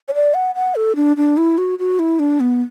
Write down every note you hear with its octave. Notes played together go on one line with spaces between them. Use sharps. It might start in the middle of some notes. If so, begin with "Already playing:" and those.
C#5
D5
F#5
F#5
A4
D4
D4
E4
F#4
F#4
E4
D4
B3